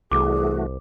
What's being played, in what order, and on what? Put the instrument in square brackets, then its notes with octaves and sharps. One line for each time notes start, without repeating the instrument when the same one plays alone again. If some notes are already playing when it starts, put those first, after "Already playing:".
[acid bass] C2 [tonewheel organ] E3 A3 F#4 [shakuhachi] G#4 [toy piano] D6